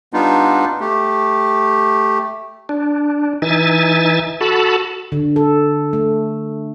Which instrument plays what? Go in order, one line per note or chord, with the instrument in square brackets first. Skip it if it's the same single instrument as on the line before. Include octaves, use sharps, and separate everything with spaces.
[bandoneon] G3 B3 D4 D#4 F4
A3 G4
[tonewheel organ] D4
E3 D#4 E5 G#5 A6
F#4 A4 A5 B5
[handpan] D3
A4
A3